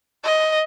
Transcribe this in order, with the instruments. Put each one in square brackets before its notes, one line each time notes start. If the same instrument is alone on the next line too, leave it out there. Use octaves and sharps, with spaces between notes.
[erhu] D#5